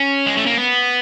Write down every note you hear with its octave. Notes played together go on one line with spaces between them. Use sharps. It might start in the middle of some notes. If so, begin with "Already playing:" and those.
Already playing: C#4
G#3
A3
A#3
B3